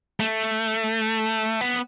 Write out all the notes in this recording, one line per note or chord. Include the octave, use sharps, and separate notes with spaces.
A3
B3